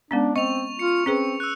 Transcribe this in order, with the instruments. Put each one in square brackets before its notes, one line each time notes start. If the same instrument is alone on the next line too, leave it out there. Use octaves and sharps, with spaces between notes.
[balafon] G#3 B3 C#4 [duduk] D4
[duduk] C4 [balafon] D#5 [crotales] C#6 F7
[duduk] F4 [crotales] C#7
[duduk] C4 [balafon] C#4 G#4 B4
[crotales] E6 F#6